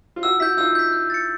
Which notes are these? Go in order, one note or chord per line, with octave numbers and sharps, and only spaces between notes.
F4
E4 F#4 E6
E4 F#4 G6 B6
D#4 F4 E6
G6 B6
F#6
A6 C#7